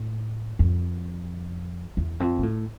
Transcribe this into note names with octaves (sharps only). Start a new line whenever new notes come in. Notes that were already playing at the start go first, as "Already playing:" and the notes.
Already playing: A2
F2
E2
F2
A#2
A2